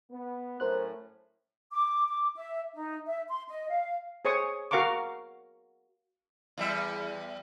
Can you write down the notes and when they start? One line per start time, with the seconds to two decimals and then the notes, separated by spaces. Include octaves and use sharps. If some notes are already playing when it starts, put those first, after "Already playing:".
0.10 B3
0.60 A2 F#3 C#4 A#4 C5 F#6
1.72 D6
2.08 D6
2.36 E5
2.75 D#4
3.06 E5
3.28 C6
3.49 D#5
3.70 F5
4.25 G#4 C5 C#5 C#6 D#6
4.71 F#4 A#4 F5 A#5 C#6 D6
6.58 E2 G3 E5